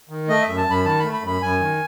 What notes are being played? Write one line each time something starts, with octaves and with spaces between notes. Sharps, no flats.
D#3
A3 D#5
E5
F#2
A5
F#2 B5
D#3 A5
A3 B5
B5
F#2
B5
F#2 G#5
D#3